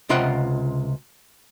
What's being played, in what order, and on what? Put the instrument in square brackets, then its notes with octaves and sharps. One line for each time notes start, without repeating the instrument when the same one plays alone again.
[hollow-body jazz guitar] C#2 C3 F4 D#5 F#5 G5